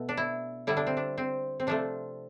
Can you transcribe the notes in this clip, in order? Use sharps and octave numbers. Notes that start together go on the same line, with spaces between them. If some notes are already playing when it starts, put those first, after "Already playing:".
Already playing: B2 A3
D4
E4
D3 G3 E4
D4
C4
D4
C4
C4
C3 F3 A3 D4